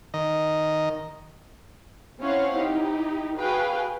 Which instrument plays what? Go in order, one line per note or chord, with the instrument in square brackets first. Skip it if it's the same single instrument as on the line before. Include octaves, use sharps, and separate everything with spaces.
[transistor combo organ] D#3 D#5
[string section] C4 C#4 E4 C#5 F5 F#5
D#4 E4 G4
F#4 G#4 B4 F5 G5